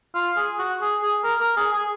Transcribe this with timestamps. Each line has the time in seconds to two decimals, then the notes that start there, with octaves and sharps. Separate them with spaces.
0.15 F4
0.36 G#4
0.59 F#4
0.81 G#4
1.03 G#4
1.24 A#4
1.40 A#4
1.57 G#4
1.73 G#4